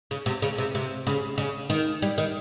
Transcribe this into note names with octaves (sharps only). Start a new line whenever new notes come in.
C#3
C3
C#3
C3
C3
C#3
C#3
D#3
G3
D#3